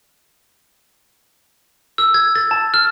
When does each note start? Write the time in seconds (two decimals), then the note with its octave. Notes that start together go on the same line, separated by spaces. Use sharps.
1.98 E6
2.14 G#6
2.35 A6
2.51 A5
2.74 F6